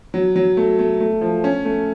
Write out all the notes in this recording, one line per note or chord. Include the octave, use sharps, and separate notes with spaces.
F#3
F#3
A3
A3
A3
F3
C#4
A3